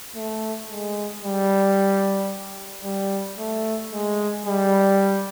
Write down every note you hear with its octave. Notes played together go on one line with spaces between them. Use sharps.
A3
G#3
G3
G3
A3
G#3
G3